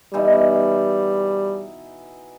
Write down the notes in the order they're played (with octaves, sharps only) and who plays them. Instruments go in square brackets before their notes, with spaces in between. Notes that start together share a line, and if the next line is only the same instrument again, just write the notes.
[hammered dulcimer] B2 E3 D#4 [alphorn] G3